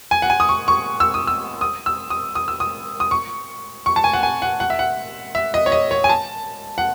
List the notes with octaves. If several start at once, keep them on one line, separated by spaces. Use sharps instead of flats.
G#5
F#5
G#5
D#6
C#6
C#6
E6
D#6
E6
D#6
E6
D#6
D#6
E6
D#6
D#6
C#6
C#6
A5
G#5
F#5
G#5
F#5
F#5
E5
F#5
E5
D#5
C#5
D#5
C#5
G#5
A5
F#5